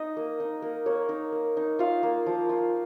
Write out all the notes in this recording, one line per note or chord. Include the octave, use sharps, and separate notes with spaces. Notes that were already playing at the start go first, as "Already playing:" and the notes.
Already playing: D#4 D#5
A#3
D#4
A#3
A#3 C#5
D#4
A#3
D#4
F4 F5
A#3
F3
F4